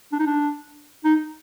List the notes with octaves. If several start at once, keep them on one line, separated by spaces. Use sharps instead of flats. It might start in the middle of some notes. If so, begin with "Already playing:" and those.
D4
D#4
D4
D#4